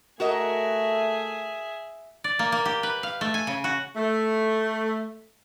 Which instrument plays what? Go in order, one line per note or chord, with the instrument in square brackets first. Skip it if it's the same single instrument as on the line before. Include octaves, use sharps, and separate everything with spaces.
[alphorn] A3 [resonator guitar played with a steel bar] F#4 A#4 D#5 [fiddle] G#4 E5
[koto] D5
A#3
A#3
G4
B4
F5
A3
G#5
C#3
F#4
[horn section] A3